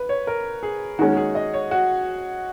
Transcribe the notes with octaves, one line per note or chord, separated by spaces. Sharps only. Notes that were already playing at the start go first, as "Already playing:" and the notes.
Already playing: B4
C#5
A#4
G#4
D#3 G#3 C#4 F#4
G#4
D#5
C#5
F#4